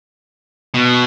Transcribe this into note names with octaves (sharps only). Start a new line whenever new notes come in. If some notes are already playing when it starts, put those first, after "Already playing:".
B2